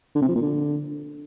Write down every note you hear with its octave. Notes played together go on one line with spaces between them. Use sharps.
D3
C3
F3
A#2
D3